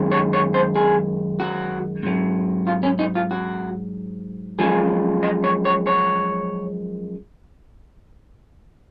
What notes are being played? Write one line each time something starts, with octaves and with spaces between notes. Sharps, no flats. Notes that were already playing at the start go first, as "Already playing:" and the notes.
Already playing: F#2 D#3 G#3
C#5
C#5
C5
G#4
F#4
G#2 F#3
F4
C#4
D#4
F4
F#4
F#2 F3 G#3 G#4
D#5
C#5
C#5
C#5